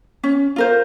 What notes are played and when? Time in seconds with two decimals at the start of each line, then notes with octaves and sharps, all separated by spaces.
0.24 C#4
0.56 F4 A#4 C5